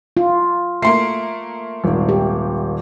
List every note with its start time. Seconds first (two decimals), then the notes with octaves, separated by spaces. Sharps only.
0.17 F4
0.82 A3 A#3 C6 C7
1.84 D#1 G#1
2.09 G4